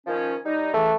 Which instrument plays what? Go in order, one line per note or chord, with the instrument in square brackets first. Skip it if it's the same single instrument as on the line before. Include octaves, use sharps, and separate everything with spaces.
[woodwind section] D#3 F3 C#4
G3 D#4
[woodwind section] C#3 E3 [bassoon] A3